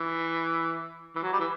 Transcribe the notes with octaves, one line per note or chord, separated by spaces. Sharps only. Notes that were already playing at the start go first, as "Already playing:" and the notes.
Already playing: E3
E3
F#3
G3
E3